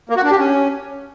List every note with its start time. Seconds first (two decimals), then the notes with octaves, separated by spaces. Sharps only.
0.09 A#3
0.17 F#4
0.24 D4
0.31 G4
0.38 C#4